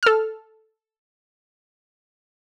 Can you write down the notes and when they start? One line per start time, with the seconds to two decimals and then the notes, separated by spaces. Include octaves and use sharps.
0.03 A4 F6